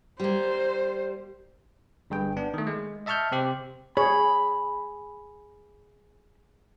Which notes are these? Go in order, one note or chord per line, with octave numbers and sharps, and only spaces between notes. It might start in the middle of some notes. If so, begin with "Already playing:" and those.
G3 A#3 C5
G1 G2 G#4 G5
B3 D4
D#3 A3
G#3
D#5 E5 A5 C#6 F6 G6
C3 C4 G4
G#4 C#5 B5